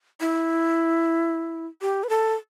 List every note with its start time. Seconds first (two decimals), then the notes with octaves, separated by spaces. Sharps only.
0.20 E4
1.81 G4
2.04 B4
2.09 A4